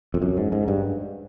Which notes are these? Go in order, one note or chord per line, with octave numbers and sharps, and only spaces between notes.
F2
F#2
G#2
G#2
G2